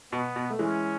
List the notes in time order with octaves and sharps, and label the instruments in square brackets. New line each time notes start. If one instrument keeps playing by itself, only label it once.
[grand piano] B2 [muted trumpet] B3
[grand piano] B2
A3
[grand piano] E3 G#3 [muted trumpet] C#4